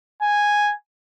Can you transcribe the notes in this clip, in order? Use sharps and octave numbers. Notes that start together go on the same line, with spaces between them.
G#5